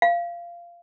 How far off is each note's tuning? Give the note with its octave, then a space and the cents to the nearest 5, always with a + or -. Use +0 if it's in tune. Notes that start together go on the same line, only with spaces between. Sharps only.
F5 -15